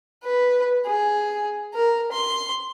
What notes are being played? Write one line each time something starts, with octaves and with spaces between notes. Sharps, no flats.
B4
G#4
A#4
C6